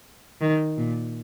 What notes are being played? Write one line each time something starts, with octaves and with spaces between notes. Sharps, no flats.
D#3
A#2